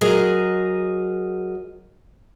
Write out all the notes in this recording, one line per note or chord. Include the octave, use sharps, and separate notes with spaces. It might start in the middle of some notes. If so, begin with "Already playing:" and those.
F#3 G#4 A#4 D#5